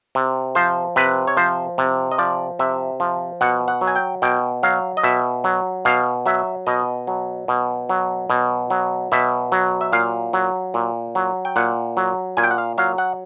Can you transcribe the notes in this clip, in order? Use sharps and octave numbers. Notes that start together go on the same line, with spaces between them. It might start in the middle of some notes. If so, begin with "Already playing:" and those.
C3
F3 C5
C3 B4
C#5
F3 C5
C3
D#5
F3 D5
C3 E5
F3
B2 F#5
F#5
F#3
G#5
G5
B2 G5
F#3 F5
D#5
B2 E5
F#3
B2 F5
F#3 E5
B2 D#5
F#3
B2
F#3
B2
F#3
B2 E5
F#3
E5
A#2 F5
F#3
A#2
F#3
G5
A#2 F#5
F#3
A#2 G#5
G5
F#5
F5
F#3 F5
F#5